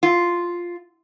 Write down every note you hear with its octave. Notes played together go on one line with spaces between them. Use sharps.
F4